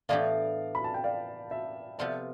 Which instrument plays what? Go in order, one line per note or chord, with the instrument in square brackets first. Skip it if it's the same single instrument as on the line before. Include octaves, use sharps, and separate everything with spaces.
[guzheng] A2 E3 B3 D4 G4 [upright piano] D5 F5
[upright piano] B5
A5
G5
D5 F5
E5
[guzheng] C3 F3 B3 F4 A4 [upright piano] D5